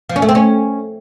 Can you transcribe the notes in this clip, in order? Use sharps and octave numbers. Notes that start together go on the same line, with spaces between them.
F3
C#4
A3
C4
C#4